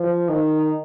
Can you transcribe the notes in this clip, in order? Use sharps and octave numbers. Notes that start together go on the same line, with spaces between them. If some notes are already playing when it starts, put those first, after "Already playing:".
Already playing: F3
D#3